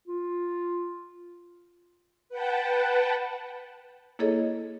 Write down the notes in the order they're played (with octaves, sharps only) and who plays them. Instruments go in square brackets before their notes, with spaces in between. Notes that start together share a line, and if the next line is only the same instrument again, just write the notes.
[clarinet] F4
[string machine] B4 F#5 G5 A5
[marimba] A#3 E4 G#4 A4 C#5 D#5